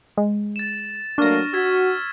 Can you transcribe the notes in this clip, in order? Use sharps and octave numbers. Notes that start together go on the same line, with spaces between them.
G#3
A6 E7
F#3 A3 A#3 D4 C#6 F6 A#6
F#4 E6 G#6 B6